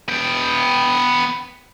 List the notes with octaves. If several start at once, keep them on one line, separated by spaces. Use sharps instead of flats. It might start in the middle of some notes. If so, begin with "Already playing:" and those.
B3 G5